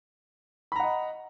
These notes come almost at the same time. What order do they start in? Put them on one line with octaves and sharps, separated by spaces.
B5 A#5 F#5 D#5